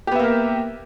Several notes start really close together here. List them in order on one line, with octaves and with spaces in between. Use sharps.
G4 B3 E5 A#3 A#4